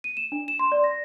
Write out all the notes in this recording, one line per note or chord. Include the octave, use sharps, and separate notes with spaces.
D#7
E7
D4
E7
C6
D5
A#6